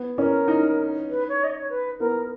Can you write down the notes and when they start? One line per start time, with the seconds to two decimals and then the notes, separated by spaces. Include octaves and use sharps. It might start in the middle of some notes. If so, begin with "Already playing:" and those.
Already playing: B3
0.18 C#4 A#4
0.48 D#4
1.10 B4
1.29 C#5
1.44 D#5
1.50 C#5
1.70 B4
2.00 B3 A#4